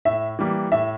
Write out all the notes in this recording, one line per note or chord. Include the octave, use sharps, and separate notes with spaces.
A2 E5
E3 G3 A#3
A2 E5